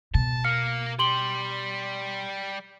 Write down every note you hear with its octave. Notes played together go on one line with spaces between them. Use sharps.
B2 A5
A#4 F5 F6 C#7
G3 G4 C6 F#7 G7